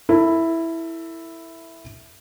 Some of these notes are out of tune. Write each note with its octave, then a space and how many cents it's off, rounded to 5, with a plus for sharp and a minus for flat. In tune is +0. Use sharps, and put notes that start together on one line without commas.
E4 +0 A4 +40